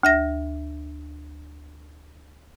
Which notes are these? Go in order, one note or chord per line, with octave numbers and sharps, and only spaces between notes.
D2 E5 A#6